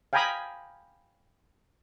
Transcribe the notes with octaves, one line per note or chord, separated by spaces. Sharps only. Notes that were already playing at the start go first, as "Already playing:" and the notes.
F5 G5 G#5 A#5 B5 D#6